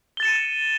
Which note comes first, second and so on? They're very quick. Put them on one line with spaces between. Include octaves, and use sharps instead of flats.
G7 A6 E7 C#7 D#7